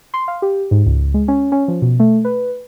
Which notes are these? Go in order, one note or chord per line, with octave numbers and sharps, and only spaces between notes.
C6
F5
G4
G#2
C#2
G#3
C#4
C#4
F3
B2
A3
B4